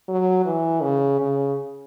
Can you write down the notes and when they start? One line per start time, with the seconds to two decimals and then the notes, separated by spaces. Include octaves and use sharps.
0.08 F#3
0.46 E3
0.82 C#3
1.20 C#3